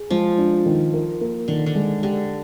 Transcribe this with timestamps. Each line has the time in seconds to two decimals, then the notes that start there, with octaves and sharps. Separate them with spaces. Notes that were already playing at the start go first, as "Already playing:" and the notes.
Already playing: G#4
0.10 F3 G#3
0.38 D4
0.66 D#3
0.93 A#4
1.21 A#3
1.48 D3 D#3
1.66 D3
1.75 G#3
2.02 D3 G4